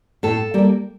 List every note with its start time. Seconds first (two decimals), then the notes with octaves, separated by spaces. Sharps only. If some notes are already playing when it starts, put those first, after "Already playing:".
0.23 A2 A4
0.54 G3 A#3